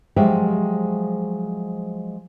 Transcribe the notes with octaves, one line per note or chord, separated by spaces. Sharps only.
F3 F#3 G#3 G4 E5 G5